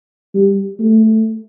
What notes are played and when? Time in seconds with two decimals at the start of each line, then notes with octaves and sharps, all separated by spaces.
0.35 G3
0.79 A3